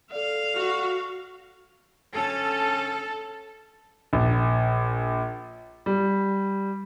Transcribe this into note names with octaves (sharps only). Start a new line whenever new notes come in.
A4 D5 F5
F#4
D3 C#4 A4
A#1
G3